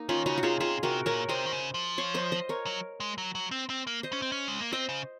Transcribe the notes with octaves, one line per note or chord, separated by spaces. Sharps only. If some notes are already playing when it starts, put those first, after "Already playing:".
Already playing: A#3 D#4
D#3 C#4 F4
C#3 D#4 F#4
F#4
C3 F4 G#4
C3 F4 G#4
C3 F#4 A#4
A#2 A#4 C#5
C3 C5 D#5
D#3
C#3
F3
C#5 F5
C5 D#5
C5 D#5
A#4 C#5
F#3
G#3
F#3
F#3
C4
C4
A#3
C5 D#5
C#4
C4
C#4
G#3
A#3
C4 C5 D#5
C#3